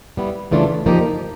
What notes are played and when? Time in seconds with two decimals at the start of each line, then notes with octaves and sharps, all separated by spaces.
0.17 G3 B3 E4
0.51 C#3 E3 A3 D4 F4
0.86 F3 A#3 D#4 G4